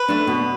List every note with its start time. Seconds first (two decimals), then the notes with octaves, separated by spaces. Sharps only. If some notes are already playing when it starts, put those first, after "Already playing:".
Already playing: B4
0.08 A3 D4
0.27 B2